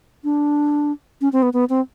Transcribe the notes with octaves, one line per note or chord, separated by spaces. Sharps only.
D4
C#4
C4
B3
B3
C4